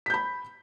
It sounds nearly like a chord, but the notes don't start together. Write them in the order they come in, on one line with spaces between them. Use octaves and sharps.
B6 G6 B5